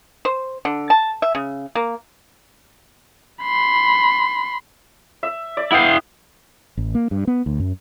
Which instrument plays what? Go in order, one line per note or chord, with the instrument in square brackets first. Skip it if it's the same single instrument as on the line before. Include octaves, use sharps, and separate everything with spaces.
[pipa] C5
D3
A5
E5
C#3
A#3
[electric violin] B5 C6
[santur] E5
D5
[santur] B3 G5 [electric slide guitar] E4 F5
[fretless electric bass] A1
A#3
G2
B3
D2
F#2